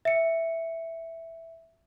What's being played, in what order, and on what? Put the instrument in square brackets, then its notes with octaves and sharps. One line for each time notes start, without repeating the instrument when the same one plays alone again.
[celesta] E5 C#7